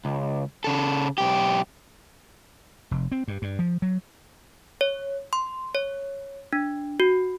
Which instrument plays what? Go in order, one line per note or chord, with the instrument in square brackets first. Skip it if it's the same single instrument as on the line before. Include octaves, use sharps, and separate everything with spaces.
[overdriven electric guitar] C#2
C#3 A4
B1 G4
[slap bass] F1
C4
G2
G2
F3
F#3
[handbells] C#5
C6
C#5
D4
F#4